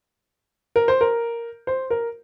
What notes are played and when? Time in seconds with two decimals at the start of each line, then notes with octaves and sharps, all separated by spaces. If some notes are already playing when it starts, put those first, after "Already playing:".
0.76 A#4
0.88 C5
1.01 A#4
1.67 C5
1.90 A#4